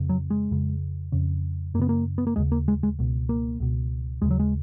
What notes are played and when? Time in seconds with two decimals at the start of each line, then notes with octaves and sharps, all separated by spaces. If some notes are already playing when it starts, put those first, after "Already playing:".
Already playing: F2 C#3
0.09 F#3
0.30 G#3
0.51 F2 C#3
1.12 F2 C#3
1.74 F#2 A#3
1.79 C#3 B3
1.89 A#3
2.18 B3
2.27 A#3
2.36 D#2 C#3 G#3
2.52 A#3
2.68 G#3
2.83 G#3
2.99 C#2 B2
3.29 A#3
3.60 C#2 B2
4.22 D#2 C#3 G#3
4.31 F#3
4.40 G#3